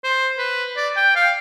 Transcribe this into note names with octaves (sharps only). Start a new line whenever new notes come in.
C5
B4
D5
G5
F5